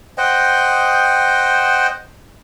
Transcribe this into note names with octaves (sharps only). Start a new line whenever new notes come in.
C5 D#5 F#5 G5